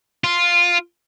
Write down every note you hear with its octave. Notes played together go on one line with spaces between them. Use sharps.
F4